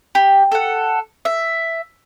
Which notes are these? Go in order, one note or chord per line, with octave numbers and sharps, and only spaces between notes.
G4
A4 F#5
E5